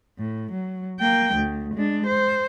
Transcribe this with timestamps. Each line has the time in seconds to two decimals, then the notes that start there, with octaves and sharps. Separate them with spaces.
0.18 A2
0.52 F#3
1.00 A#3 G5
1.35 D2
1.75 G#3 D4
2.07 C5